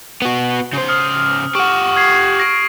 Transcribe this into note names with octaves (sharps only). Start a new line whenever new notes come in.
B3 F#4
C#3 C5
D#6 F6 C#7
G4 F#5 C#6 E7 F#7
D#6 G#6 C7
A#6 D7